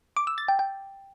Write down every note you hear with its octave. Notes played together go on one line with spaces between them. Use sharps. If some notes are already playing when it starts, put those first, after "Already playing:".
D6
E6
A6
G5
G5